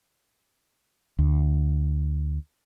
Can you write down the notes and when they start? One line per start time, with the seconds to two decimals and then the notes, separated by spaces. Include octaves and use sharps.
1.19 D2